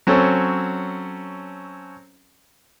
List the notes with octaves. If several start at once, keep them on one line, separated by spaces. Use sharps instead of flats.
F#3 C4 C#4 A4